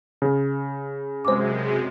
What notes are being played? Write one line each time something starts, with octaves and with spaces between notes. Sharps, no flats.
C#3
F#2 C3 G#3 C5 D6